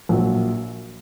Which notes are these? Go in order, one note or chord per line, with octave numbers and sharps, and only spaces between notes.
A#1 A#2 F#3